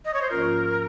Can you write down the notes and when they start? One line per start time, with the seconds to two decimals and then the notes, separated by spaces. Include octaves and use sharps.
0.05 D#5
0.14 C#5
0.21 C5
0.30 G#2 F3 A#3 C#4 F4 A#4